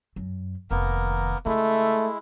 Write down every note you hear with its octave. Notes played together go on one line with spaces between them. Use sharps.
F#2
F1 D#3 A#3 B3 A#4
C#3 G#3 A3 E4